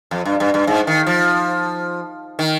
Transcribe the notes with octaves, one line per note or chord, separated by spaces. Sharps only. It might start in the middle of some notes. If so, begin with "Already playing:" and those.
F2
G2
G2
G2
G#2
D#3
F3
D#3